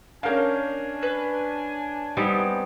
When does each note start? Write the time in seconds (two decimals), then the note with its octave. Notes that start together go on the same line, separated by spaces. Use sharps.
0.23 A#3 C#4 D4 A#4 F5 G#5 G6
1.02 B4
2.17 G3 B3 C4 D#4